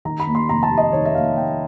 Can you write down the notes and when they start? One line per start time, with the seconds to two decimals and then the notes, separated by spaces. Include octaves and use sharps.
0.05 D#3 A#5
0.20 B5
0.27 D#2
0.35 C6
0.49 F1 A#5
0.63 A5
0.70 G3
0.77 D#5
0.92 D#3 C#5
1.06 E5
1.14 D#2 F5
1.36 F1 G5